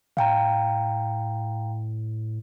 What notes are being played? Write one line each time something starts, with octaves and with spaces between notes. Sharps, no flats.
A2 F5 G5 A#5